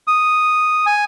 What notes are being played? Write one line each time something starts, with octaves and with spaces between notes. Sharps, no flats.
D#6
G#5